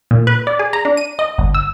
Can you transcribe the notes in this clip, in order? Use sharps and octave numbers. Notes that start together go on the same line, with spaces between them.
A#2
B4
D5
G#4
A#5
D4
D#7
D#5
G1
E6